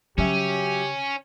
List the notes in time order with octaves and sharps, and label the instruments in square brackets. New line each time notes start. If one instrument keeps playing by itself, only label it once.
[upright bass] C#3 [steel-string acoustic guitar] F#3 E5 [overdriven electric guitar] C#4 [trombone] G4